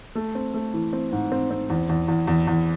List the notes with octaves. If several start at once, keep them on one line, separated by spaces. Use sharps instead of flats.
A3
C4
A3
E3
C4
G#2
C4
C4
E2
E2
E2
E2
E2